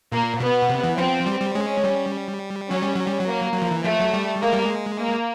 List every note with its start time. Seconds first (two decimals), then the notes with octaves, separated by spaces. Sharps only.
0.12 A#2 A#3
0.40 B2 B3
0.69 C3
0.83 E3
0.98 F3 C4
1.26 G3
1.41 G3
1.55 G#3 C#4
1.84 G3
2.70 F#3 C#4
2.83 G3
2.95 F#3
3.07 G3
3.19 F#3
3.27 A#3
3.53 F#3
3.62 F3
3.71 E3
3.84 F3 A3
4.00 F#3
4.14 G3
4.42 G#3 A#3
4.53 G3
4.64 G#3
4.99 A#3